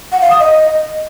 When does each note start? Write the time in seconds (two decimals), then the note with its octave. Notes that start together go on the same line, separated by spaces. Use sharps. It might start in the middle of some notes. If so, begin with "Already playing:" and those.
0.12 F#5
0.21 F5
0.31 D#6
0.40 D#5